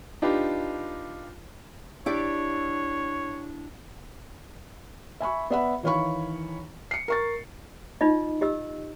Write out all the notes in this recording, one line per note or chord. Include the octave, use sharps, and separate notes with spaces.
D4 D#4 F4 G4 B4
D4 E4 G4 C#5 D5
E5 G#5 B5 C#6
B3 D5 E5 F#5 B5
D#3 E3 C#5 F5 B5 C#6
C7 C#7
A#4 C#6 A6
D#4 F4 D#5
G4 D#5 E6